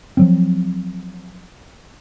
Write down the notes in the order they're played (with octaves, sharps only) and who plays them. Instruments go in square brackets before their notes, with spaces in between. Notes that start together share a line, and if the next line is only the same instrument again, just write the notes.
[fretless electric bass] F3 F#3 C4